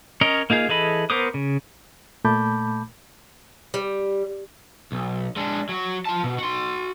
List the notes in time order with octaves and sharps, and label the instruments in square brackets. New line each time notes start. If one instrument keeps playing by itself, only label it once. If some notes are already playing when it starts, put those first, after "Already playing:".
[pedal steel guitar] C#4 A#4 C#5 D#5
A#3 D#4 F4 G#4
E3 G#4 A4 D#5 B5
B3 A#4 C5 D6 D#6
C#3
[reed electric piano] A#2 A3 A5 B5 D6 G6
[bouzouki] G3
[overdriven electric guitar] B1
G#3 D4
F#3 F#4
F4 A5
B2
F#4 C6